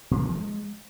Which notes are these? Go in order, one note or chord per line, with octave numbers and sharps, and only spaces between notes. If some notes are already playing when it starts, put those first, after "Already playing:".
A#2
A#3
D3
F3
G#3